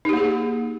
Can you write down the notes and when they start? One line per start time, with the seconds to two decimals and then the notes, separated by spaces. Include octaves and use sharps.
0.05 D#4
0.09 G4
0.13 A#3
0.17 G#4